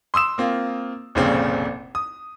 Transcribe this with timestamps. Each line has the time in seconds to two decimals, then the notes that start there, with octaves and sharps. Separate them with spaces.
0.14 C6 D#6 E6 E7
0.38 A#3 C4 F4
1.15 F1 C2 A#2 C#3 C4
1.95 D#6